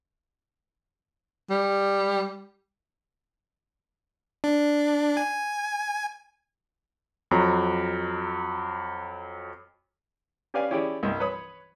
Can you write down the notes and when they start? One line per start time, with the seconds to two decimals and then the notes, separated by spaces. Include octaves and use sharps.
1.50 G3
4.44 D4
5.17 G#5
7.31 F2 F#3 A#5
10.54 C#4 G4 B4 D5 F5 G#5
10.71 C#4 E4 G4 G#4 D5
11.03 C2 G2 D#5
11.20 B4 C#5 B5 D#6